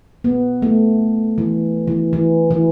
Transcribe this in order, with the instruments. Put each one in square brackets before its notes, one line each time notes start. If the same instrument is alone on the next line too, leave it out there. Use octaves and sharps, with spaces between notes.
[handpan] B3
A3
E3
E3
E3
E3